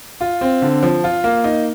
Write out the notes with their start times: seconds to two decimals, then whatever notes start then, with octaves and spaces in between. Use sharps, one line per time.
0.21 F4
0.41 C4
0.62 D3
0.83 F3
1.04 F4
1.24 A#3
1.44 D#4